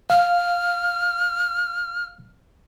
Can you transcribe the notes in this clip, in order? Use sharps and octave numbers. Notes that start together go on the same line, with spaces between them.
F5 F6